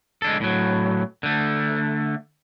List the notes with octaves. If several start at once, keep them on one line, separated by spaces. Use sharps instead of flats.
G#3 D4 A4
A2 F#3
D3 A3